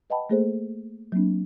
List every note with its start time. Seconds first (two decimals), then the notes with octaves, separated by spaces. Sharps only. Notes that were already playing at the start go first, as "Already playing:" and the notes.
0.10 B4 D#5 F#5 G5 A5 B5
0.30 A3 A#3 G#4 A4 C5
1.12 F#3 A#3 C4 D4